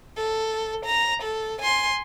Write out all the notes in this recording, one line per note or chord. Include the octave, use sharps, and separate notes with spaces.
A4
A#5
A4
G#5 C6